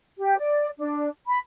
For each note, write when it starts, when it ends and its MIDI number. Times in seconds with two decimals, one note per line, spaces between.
0.19 0.39 67
0.39 0.69 74
0.78 1.08 62
1.27 1.38 83